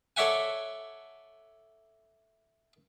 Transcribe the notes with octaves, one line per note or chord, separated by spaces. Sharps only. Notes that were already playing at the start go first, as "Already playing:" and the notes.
A4 C#5 D5 E5 F#5 G#5